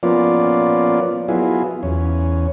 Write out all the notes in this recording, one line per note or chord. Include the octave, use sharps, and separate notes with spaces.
F3 A#3 B3 C#4 F4 D5
F#3 B3 E4 F4 G#4
E2 C#4